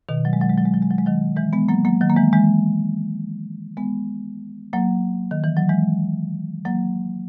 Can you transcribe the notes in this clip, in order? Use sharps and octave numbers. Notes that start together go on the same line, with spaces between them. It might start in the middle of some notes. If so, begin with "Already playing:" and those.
B2 D#3
F#3
G#3
F#3
G#3
F#3
G#3
F#3
G#3
F#3
G#3
D#3 F#3
E3 G#3
G#3 B3
F#3 A#3
F#3 A#3
D#3 F#3
A#3
E3 G#3
E3 G#3
G#3 B3
F#3 A#3
D#3
E3
F#3
E3 G#3
F#3 A#3